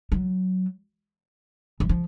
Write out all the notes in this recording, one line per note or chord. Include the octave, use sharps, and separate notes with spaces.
F#3
E3
F3